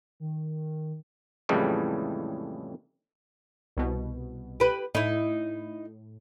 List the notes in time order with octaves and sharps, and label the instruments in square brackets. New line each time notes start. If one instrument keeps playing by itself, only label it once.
[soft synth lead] D#3
[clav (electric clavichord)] F2 A2 C#3 E3 G3 G#3
[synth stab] C2 B2
[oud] G4 B4
[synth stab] A2 [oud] D#4 E4